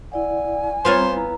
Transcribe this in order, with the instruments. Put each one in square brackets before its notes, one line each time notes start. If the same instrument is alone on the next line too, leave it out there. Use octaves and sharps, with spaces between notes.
[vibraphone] E4 D5 F#5 [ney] G#5
[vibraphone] G3 C4 A#5 [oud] B3 F4 C#5 [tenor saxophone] C5
[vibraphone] E4 A#5